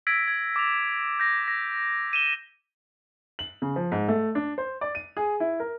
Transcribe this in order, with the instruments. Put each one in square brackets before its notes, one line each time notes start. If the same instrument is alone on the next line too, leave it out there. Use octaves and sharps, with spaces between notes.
[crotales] E6 G#6 A#6 B6 D7
G#6
D6 A6 F7
G6 A#6
A#6
D#7 E7 G7
[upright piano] F#7
C#3
F3
G#2
A3
D4
C5
D5
D#7
G#4
E4
A#4